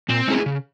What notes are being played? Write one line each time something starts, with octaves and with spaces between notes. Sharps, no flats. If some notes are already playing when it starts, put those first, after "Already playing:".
A#2 C4
G#3 C#4 E4 G#4
C#3